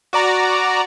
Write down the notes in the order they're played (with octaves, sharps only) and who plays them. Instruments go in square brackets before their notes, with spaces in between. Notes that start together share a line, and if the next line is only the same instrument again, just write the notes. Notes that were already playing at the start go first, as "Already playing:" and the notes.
[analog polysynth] F#4 D5 A#5